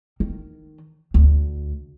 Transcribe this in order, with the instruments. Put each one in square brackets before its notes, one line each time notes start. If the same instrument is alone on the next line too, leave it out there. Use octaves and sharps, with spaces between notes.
[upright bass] D#3
D2